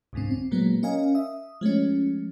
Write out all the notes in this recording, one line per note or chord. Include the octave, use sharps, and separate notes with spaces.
C2 F2 G#2 D3 C4
C4
A#2 F#3 G#3 A#3 B3
C#4 A#4 D#5 F5 G#5
E5 D#6
F3 G#3 A3 C#4